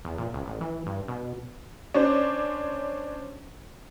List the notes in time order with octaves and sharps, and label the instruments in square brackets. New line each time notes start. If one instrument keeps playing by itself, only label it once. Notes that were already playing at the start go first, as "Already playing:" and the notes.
[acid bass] E2
A#2
C#2
A1
E3
G2
B2
[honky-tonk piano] C#4 D4 C5